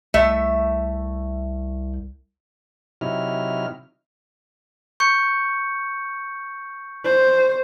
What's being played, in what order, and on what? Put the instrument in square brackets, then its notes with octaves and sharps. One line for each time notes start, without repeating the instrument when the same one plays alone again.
[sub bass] C2 [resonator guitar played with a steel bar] A3 E5
[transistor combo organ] C3 F#3 D#4 E4 F6
[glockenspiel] C#6 G6 C#7
[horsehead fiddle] C5